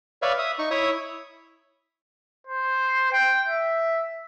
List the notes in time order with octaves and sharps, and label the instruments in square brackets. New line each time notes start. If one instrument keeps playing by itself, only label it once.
[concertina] B4 C#5 D5 E5 F5
E5 D#6
D#4 C#6
E4 C#5 E5 D#6
[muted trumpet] C5
G5
E5